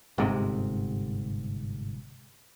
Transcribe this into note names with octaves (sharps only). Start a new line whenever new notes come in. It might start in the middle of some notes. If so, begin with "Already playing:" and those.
G1 G#2 C3